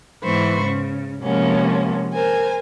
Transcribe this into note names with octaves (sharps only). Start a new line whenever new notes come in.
G#2 E3 B3 C5 B5 C#6
C#3
C3 F3 G#3 A#3 B3 C#4
A#4 C5 G#5